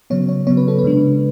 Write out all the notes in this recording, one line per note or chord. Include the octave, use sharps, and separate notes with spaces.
C#3 F#3 B3 C#5
C#5
C#3 F#3 B3 C#5
B4
A4
B4
C#3 G#3 D4